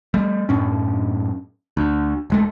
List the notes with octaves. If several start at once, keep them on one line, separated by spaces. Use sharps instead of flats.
G3 A3
F#2 A2 C#4
D2
E1 G#3 A3